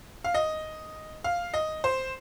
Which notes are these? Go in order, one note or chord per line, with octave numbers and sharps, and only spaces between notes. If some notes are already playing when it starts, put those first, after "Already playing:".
F5
D#5
F5
D#5
C5